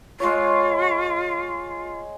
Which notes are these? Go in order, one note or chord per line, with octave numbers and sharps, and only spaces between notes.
G#3 F4 C#5